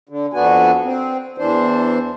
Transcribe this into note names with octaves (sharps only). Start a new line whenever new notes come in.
D3
F2 B3 D4 F#4 G#5
C4
E2 E3 D4 C5